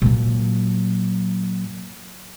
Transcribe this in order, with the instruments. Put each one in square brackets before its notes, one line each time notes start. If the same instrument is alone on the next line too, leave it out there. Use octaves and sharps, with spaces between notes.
[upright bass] A#2 F#3